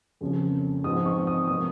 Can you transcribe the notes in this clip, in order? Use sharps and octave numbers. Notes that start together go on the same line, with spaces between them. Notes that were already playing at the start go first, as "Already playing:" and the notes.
F2 C#3 F3 A#3 C#4
G#2 F3 C4 D#6
C#6
D#6
C3 F3 A#3 D#6